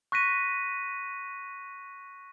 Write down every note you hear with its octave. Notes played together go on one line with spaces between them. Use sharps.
C#6 F#6 A#6 B6 D#7